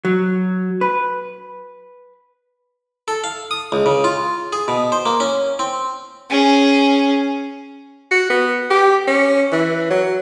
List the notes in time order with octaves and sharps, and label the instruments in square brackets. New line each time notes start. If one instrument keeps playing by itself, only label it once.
[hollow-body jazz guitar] F#3
B4
[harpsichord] A4
F5
D#6
C#2
C#3
F4
G#4
B2
C5
A#3
C#4
C4
[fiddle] C#4 G#4
[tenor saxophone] F#4
B3
G4
C#4
E3
F#3